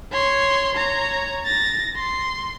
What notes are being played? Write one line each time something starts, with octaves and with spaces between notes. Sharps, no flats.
C#5 C6
C#5 A#5
A6 A#6
C6